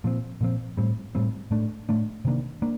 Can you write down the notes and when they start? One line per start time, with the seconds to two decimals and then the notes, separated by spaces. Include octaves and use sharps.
0.04 A#2 F3 C4
0.41 A#2 F3 C4
0.77 A2 G3 C4
1.15 A2 G3 C4
1.51 A2 A3 D4
1.89 A2 A3 D4
2.25 C3 D#3 A#3 D4
2.62 A#3 D4